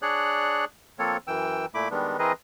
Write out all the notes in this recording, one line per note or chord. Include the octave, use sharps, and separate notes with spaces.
D4 G#4 C#5 D5 F#6
F3 A#3 C4 A4 C#5
F#2 E3 G5 E6
A#2 A3 E4 B5 D6
D#3 G3 G#3 B3 D4
E3 C4 G#4 A#4 B4 D#5